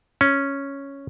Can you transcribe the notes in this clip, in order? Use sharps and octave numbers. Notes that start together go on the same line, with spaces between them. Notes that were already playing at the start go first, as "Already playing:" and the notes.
C#4